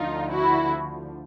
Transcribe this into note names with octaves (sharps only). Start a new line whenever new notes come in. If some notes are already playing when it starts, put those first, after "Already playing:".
Already playing: D2 D3 F3 D#4 F4
E4 F#4